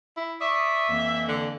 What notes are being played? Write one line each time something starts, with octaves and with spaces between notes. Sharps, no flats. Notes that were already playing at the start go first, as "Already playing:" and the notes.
E4
D5 E5 C#6 D#6
F2 E3 A#3
D3